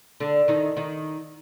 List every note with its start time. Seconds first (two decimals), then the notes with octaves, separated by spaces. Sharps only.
0.20 D3 D4
0.48 D#3 D#4
0.77 D#3 D#4